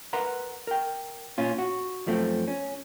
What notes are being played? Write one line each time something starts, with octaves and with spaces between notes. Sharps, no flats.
A#4 B4 F#5 A#5 C6
A#4 G5
A#2 C#4 F4
F#4
F#2 F3 A3 C4
C#4